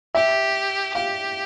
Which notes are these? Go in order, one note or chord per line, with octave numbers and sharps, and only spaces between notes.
G4 E5
G4 F5